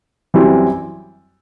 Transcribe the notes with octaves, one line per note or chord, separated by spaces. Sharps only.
F#2 E3 G3 C4 E4